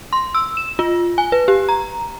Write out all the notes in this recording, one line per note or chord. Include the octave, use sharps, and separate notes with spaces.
C6
E6
E7
F4
G#5
B4
G4
A#5